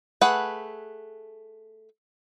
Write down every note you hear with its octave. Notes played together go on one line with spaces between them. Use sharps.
A3 G#4 B4 F#5